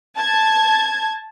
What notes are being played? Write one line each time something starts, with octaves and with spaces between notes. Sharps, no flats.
A5 G#6